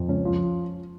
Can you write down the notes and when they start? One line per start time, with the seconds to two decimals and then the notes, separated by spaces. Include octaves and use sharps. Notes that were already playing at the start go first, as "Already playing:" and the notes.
Already playing: F2
0.08 C#2 C#4
0.25 F3